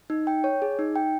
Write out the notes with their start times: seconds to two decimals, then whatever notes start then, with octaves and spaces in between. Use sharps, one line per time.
0.10 D#4
0.27 G5
0.44 C#5
0.62 G#4
0.79 D#4
0.96 G5